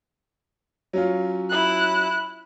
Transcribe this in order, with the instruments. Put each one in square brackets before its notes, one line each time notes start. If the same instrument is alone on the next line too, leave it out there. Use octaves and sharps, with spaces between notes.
[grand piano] F#3 C#4 F4
[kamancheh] E4 F#6